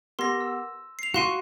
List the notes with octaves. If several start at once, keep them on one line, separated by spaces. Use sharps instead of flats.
B3 G4 A#4 C6 A#6
E6
C7 F7
F#4 F5 C6 C#6 D#7